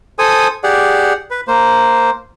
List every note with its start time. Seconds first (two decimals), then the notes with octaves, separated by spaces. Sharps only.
0.19 A4 C5 G#5 D#6
0.64 G4 G#4 D5 F#5
1.31 B4
1.48 A#3 C5